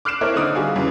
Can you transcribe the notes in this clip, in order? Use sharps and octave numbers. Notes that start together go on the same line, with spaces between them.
D6 F6 F#6 C7 D7 E7
C4 E4 A4 A#4 C#5
D3 D#4 D#6
G3 F#4 G#4 F5
F#2 C#3 E3